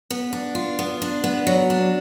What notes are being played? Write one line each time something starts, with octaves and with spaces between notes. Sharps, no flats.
B3
D4
F4
B3
D4
B3
F#3
D4